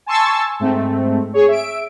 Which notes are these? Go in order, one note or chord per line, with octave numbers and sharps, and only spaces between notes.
G#5 A5 C6 C#6 E6 A6
G#2 A3 C4
G#4 C#5
E5 D7